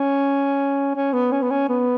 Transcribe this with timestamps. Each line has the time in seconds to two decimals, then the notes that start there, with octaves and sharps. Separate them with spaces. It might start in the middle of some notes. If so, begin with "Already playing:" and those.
Already playing: C#4
0.96 C#4
1.13 B3
1.32 C#4
1.42 B3
1.51 C#4
1.69 B3